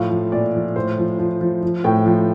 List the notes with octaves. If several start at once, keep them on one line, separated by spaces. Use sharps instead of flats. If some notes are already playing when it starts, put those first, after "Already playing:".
Already playing: A2 F3 F5
F3
A#2 D5
F3
A2 C5
F3
F3
F3
F3
A2 G5
F3